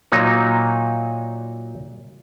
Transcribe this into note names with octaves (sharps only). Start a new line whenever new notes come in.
A#2 F#3 A#3 D#4